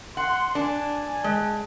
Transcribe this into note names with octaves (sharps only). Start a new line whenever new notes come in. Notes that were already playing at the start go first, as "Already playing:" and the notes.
F#5 C6
D4 G#5 A5
G#3